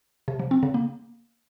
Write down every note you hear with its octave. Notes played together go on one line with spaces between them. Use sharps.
C3
F3
C4
C#3
A#3